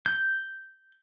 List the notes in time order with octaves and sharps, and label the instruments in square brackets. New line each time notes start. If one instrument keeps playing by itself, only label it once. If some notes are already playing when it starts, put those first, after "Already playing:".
[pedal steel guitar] G6